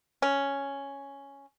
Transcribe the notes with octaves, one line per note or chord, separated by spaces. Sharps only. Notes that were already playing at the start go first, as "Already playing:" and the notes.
C#4